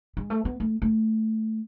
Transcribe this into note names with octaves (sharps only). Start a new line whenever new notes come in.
G#3
A3
B3
A3
A3